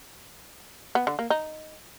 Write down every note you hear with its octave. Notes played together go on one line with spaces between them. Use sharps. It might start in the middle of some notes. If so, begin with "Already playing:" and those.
B3
D3
A#3
D#4